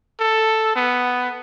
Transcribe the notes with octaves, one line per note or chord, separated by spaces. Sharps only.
A4
B3